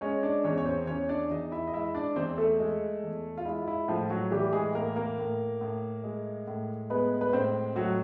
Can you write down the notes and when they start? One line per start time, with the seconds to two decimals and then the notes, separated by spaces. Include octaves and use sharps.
0.01 G#3 C#4 C#5
0.23 D4 D5
0.44 E2 C#4 C#5
0.58 C#5
0.66 C4 C5
0.87 E2 C#4 C#5
1.09 D4 D5
1.31 E2 D#4 D#5
1.52 E4 E5
1.67 D#5
1.73 G#3 E4 E5
1.95 D4 D5
2.16 E2 C4 C5
2.38 A3 A4
2.59 G#3
3.03 E2
3.38 F4
3.45 G#3 E4
3.62 F4
3.68 E4
3.88 A2 F3 F4
4.10 F#3 F#4
4.31 E3 G3 G4
4.53 G#3 G#4
4.74 A2 A#3 A#4
4.96 A#3 A#4
5.18 A2
5.61 A2
6.04 G#3
6.48 A2
6.90 G#3 B3 B4
7.21 B4
7.33 A2 C4 C5
7.76 A2 F#3 F#4